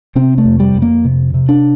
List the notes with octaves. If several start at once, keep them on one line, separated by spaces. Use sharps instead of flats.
C3 C4
A3
F2
G3
F2
A#3
C3
C3
D4